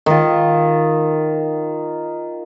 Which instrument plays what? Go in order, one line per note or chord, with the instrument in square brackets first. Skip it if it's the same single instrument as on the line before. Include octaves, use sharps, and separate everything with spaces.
[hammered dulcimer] D#3 F4